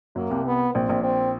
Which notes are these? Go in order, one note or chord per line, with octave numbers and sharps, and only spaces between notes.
F#2 F#3 A#3
C2 C3
B3
A#1 A#2 C4
A#1 A#2
C4